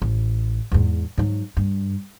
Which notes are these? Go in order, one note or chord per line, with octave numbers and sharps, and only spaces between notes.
A1
E2 G#2
G#2 F#3
G2